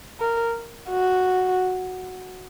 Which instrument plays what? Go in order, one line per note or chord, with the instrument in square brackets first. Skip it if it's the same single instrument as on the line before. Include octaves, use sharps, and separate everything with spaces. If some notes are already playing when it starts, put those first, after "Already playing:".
[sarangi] A#4
F#4